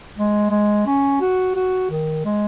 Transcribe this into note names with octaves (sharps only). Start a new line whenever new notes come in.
G#3
G#3
C#4
F#4
F#4
D#3
G#3